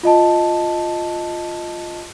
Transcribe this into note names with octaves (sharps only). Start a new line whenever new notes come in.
F4 D#5 A5